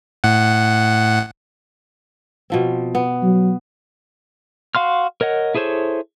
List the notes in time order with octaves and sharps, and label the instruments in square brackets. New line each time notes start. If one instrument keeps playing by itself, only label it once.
[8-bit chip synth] A2 F#5
[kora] B2 F3 C4
B3
[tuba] F#3
[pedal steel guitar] F#4 F5 C6 F6
A#4 C#5 D#5 F#5
E4 G#4 A4 C5 C#5